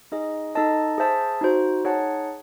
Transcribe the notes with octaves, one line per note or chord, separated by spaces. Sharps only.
D#4 G#4 D#5
D#4 A4 D#5 A5
G#4 C5 E5 A5
D#4 F#4 C5
D#4 G#4 C#5 F#5 A5